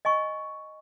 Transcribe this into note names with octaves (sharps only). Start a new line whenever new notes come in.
D#5 G#5 C#6